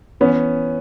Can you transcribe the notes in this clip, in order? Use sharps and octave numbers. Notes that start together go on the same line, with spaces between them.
E3 B3 C#4